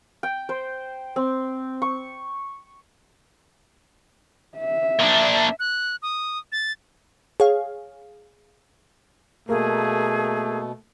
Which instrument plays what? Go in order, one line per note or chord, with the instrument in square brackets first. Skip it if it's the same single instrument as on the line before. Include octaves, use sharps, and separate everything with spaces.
[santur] G5
C5
C4
C#6
[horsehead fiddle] E5
[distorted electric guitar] A#2 D4
[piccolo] F#6
D#6
A6
[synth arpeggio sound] G#4 C#5 F5
[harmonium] B2 [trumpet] A3 [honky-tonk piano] A#3 [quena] G#4